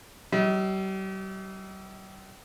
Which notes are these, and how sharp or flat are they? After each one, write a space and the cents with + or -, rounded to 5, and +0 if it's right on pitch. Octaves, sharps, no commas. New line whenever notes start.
G3 -40 D#5 +45